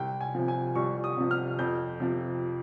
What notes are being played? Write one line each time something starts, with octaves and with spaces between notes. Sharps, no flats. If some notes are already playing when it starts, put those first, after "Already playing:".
Already playing: C2 G5
G#5
C3 F3
G#5
C2 C#6
D#6
C3 F3
F6
F2 G6
C3 F3